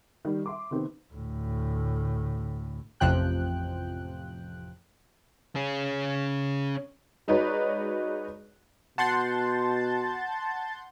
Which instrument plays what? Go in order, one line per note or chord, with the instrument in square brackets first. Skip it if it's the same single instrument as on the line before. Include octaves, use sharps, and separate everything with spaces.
[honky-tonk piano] D#3 G3
E5 C6 D6
C3 D#3 B3 C4
[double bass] D2 A2
[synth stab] A1 F2 C3 F3 G5 F#6
[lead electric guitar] C#4 G#4
[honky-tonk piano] G#3 D#4 F#4 B4 C#5 D5
[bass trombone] B2 [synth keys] F#5 C6 G6 [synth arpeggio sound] A5 A6